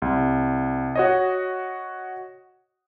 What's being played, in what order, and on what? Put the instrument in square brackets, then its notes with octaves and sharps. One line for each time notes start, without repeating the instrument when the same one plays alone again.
[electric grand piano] C2
F#4 C#5 D#5